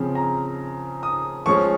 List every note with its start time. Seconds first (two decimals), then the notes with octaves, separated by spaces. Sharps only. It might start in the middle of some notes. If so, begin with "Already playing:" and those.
Already playing: C#3 F3 C4
0.15 A#5
1.03 D#6
1.46 F3 G#3 C#4 C#6